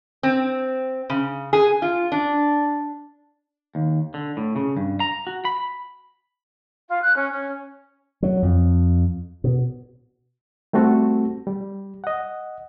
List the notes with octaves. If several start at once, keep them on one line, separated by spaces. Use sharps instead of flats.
C4
C#3
G#4
F4
D4
D#2
D3
A2
C#3
G2
A#5
F#4
B5
F4
F#6
C#4
C#4
F#3
F2
B2
G3 A3 C4 F#4 A4
G3
D#5 F#5